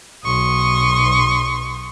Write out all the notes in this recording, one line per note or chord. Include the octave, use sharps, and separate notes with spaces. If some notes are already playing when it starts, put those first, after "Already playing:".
B1 C6 C#6 D#6